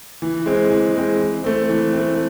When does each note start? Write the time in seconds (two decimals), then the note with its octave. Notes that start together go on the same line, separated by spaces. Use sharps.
0.22 E3
0.46 G#3 C4
0.71 E3
0.95 G#3 C4
1.19 E3
1.44 A3 C4
1.69 E3
1.93 A3 C4